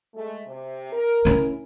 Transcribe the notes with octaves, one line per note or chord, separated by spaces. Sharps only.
G#3 A3
C3
A#4
C#4 E4